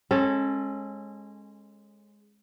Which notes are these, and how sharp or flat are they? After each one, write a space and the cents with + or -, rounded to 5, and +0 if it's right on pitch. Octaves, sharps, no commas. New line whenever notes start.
G#3 +0 C#4 -25 A4 +0